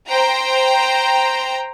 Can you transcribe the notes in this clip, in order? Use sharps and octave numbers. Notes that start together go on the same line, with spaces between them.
C5 G5 A#5